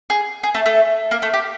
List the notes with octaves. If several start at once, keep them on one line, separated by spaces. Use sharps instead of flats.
G#4
G#4
A3 A4
A3 A4
A#3 A#4
A3 A4
G4